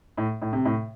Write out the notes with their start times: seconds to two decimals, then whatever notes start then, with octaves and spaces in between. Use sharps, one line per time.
0.18 A2
0.42 A2
0.53 C3
0.65 A2